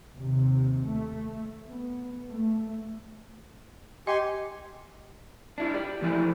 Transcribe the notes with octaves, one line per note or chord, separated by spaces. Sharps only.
D#2 C3
A3
B3
A3
G4 D#5 G#5 C6
D4 E4 F4
G4 D5
A2 E3 F3 A3 E4